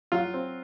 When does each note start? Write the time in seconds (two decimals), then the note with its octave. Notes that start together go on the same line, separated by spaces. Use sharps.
0.12 F#3 F4
0.34 C4